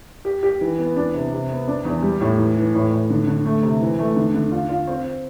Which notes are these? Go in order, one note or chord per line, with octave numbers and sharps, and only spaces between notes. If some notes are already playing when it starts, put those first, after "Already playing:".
G4
G4
E3
B3
D4
C3
C3
B3
D4
E2
G3
A2
E3
E3
A2
A2
D3
D3
A3
C3
E3
A3
D3
D3
F4
F4
C4